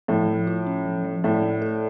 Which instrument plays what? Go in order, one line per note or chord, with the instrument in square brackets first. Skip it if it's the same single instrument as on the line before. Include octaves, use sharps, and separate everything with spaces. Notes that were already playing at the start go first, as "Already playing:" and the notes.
[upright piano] A2 [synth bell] F3
[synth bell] F3
F4
C#4
F3
F3
[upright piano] A2 [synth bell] D5
[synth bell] A3
A4